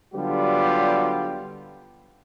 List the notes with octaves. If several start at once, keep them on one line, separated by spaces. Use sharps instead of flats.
D3 F#3 G3 B3 F4 G4